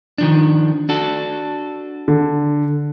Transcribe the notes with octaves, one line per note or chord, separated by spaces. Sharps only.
D#3 F3 D4
D4 F#4 A4
D3